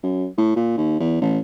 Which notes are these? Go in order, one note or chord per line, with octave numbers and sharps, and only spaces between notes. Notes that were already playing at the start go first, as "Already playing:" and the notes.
F#2
A2
A#2
D#2
E2
A1